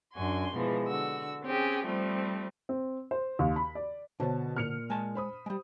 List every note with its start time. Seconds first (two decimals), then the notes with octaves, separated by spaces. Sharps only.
0.14 F#2 D4 F#4 G#5 C6
0.55 B2 E3 F3 G#3
0.86 D3 F#4 E6
1.43 C4 C#4 G4 G#4
1.85 F3 G3 A3 C4
2.69 C4
3.11 C5
3.39 D#2
3.56 B5
3.75 D5
4.20 B2 D3 C5 C#5 A5
4.56 A#2 A#3 F6 C#7 F7
4.90 G#3 G#5 A5
5.15 C5 B5 D#6
5.46 G3 G#3